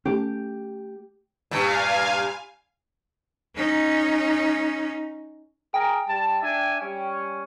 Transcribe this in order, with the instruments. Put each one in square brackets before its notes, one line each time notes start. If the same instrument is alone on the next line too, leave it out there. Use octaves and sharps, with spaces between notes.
[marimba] A3 [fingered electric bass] C#4 [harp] G4
[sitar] G2 A#2 [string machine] F5 G#5
[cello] C#4 D#4
[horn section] G#4 A#4 [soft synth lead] G5
[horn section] G3 A5
D4 E5 G#5
G3 C#4